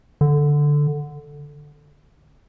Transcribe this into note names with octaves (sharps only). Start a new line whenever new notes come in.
D3